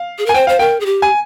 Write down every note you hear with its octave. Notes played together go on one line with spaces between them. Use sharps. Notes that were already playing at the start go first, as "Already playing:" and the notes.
Already playing: F5
G#4
A#4 G#5
C5 G5
C5 F5
A#4 G5
G#4
G4
G#5